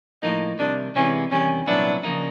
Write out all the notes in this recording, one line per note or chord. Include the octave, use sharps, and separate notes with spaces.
A2 F3 A#3 D#4
C2 C3 D#3 D4
C3 E3 G#3 B3 C#4
E2 C3 D#3 G3 C#4
C2 A#2 F#3 B3 D4 E4
C#3 F3 A#3 D#4